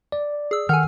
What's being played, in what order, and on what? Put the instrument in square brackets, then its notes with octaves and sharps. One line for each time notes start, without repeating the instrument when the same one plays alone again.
[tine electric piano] D5
[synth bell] G#4 E6
[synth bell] D#3 A4 G#5 [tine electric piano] F#5 F6